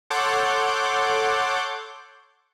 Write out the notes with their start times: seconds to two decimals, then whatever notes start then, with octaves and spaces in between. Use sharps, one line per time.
0.10 A4 C#5 F#5 C6 D6 G6